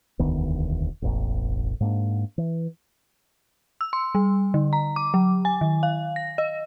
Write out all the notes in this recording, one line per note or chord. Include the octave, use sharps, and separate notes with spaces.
E1 D2 D#3 B3
E1 A1
G#2 A#3 D4
E3
E6
C6
G3
D3
A#5
D6
F#3
G#5
D#3
F5
A#6
D#5